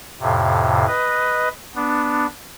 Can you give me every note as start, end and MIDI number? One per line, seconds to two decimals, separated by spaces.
0.20 0.85 41
0.20 0.85 45
0.20 0.85 48
0.87 1.49 71
0.87 1.49 75
1.76 2.26 59
1.76 2.26 62